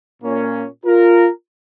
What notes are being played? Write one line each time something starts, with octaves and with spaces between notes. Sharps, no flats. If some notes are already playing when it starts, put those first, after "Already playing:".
A#2 A#3 C#4
F4 A#4